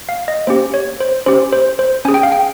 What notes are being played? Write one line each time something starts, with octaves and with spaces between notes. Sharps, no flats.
F5
D#5
A#3 C#4 G4 C5
C#5
C5
C#4 G4 C5
C5
C5
C#4 G#4 G#5
G5
F5
G5